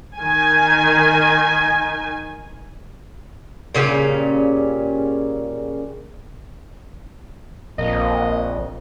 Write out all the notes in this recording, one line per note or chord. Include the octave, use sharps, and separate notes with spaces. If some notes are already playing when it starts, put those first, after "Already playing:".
D#3 G#5
A#2 C#3 G3 C#4
A#1 F2 A#3 D#5